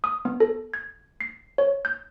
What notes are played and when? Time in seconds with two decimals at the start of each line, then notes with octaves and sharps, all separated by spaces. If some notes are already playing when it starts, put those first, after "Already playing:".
0.04 D#6
0.25 B3
0.40 A4
0.74 G#6
1.21 C7
1.58 C#5
1.85 G6